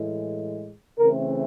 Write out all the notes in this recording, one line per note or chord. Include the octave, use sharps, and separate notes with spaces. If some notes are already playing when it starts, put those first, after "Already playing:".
Already playing: A2 E3 G#3
C#3 E3 A3 C4 A#4